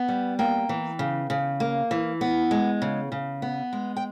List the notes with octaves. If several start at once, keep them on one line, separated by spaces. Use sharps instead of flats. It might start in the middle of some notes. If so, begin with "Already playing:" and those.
Already playing: B3
G3
A#3 G5
E3
C#3
C#3
A#3
E3
B3
G#3
C#3
C#3
B3
G#3
G5